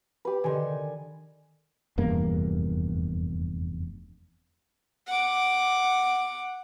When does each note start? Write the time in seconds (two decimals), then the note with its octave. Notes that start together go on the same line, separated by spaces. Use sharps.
0.25 G4 B4
0.44 D3 D#3 G#5 C6
1.98 F1 E2 G2 A#3
5.07 F#5 D6